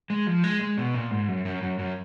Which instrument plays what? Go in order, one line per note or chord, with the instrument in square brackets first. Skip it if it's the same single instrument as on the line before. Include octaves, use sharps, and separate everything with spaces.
[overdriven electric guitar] G#3
F3
G#3
G#3
B2
A#2
G#2
F#2
F#2
F#2
F#2